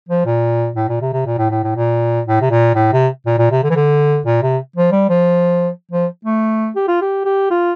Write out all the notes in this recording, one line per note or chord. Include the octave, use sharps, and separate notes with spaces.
F3
A#2
A2
A#2
C3
C3
A#2
A2
A2
A2
A#2
A2
C3
A#2
A2
C3
A#2
A#2
C3
D3
E3
D3
A#2
C3
F3
G3
F3
F3
A3
G4
F4
G4
G4
F4